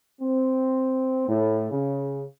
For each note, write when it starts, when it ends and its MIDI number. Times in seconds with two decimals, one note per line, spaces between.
0.21 1.24 60
1.28 1.70 45
1.71 2.23 49